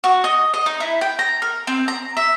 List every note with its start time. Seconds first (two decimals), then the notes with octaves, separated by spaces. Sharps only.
0.04 F#4
0.24 D#5
0.54 D#5
0.66 D#4
0.80 E4
1.01 G5
1.19 A#5
1.42 A#4
1.67 C4
1.88 A#5
2.17 E5